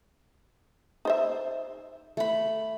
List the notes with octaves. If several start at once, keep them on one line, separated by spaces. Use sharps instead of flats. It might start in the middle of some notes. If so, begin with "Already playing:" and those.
D#4 C5 E5
A3 B5